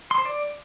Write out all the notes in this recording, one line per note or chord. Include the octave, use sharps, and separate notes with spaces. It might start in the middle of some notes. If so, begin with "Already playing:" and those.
C6
C5
D5